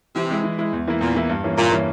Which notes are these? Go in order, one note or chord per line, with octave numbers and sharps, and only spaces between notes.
C3 E3
G#3 E4
E3
G#3 E4
E2
E3 A#3 E4
E2 A#2
E3 A#3 E4
G2
E3 A#3 C#4
G2 A#2
E3 A#3 C#4